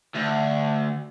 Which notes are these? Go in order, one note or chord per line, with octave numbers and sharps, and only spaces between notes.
D2